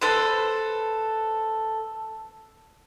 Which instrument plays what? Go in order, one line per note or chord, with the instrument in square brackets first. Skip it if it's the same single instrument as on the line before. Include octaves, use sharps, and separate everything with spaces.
[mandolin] A4 B4 C5